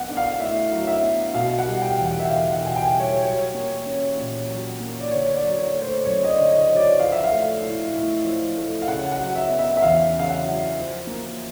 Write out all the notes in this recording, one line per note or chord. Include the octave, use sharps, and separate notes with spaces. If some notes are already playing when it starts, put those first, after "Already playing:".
Already playing: F#3 B3 F#5
D4
F5
A2 E5
F#3
E5
B3
B2 F5
F#5
G3
G5
E2
F#5
E5
E2 F5
F#5
B2
G#5
G5
G3
C#5
F#3 C#5
A#3
C#4
A#2
F#3
A#3
D5
D3 C#5
D5
F#3
C#5
A3
C5
F#2 C#5
D#5
D5
D3
D#5
F#3
D5
F3 F5
E5
F5
A3
A2
A2
F3
A3
F5
C#3 F#5
F#5
F#3
E5
B3
E5
E5
E2 F5
C#3
F5
F#5
F#3
F3
A#3